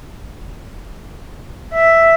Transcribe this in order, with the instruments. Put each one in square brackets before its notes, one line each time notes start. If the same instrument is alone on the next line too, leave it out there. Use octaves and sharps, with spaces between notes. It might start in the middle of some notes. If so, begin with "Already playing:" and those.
[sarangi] E5